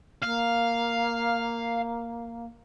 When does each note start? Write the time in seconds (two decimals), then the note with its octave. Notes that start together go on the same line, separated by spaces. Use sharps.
0.22 A#3 F5